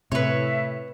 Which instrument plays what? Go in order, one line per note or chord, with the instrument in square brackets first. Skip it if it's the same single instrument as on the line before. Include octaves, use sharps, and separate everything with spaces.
[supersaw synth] A2 [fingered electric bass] C3 [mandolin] B4 C#5 [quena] E5